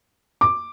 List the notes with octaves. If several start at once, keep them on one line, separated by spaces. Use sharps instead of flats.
D6